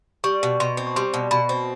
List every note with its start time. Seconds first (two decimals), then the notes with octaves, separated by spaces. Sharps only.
0.24 G3 C#6
0.43 B2
0.60 B2 C6
0.77 C4
0.87 C#6
0.96 G3 C6
1.14 B2
1.31 B2 B5
1.49 C4